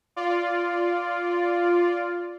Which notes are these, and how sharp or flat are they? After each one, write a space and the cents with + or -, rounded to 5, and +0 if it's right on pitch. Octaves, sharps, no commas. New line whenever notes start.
F4 +0 D5 -5